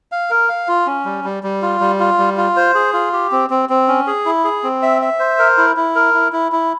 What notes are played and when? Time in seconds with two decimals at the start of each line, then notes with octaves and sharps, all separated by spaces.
0.12 F5
0.30 A#4
0.49 F5
0.68 F4
0.87 C#4
1.05 G3
1.24 G3
1.43 G3
1.62 F4
1.81 G3
2.00 F4
2.19 G3
2.37 F4
2.56 C5
2.75 G#4
2.93 F4
3.13 G4
3.32 C4
3.50 C4
3.69 C4
3.88 C#4
4.07 G#4
4.26 E4
4.44 G#4
4.63 C4
4.82 E5
5.02 E5
5.20 C5
5.39 A#4
5.58 E4
5.77 E4
5.95 A#4
6.14 E4
6.32 E4
6.52 E4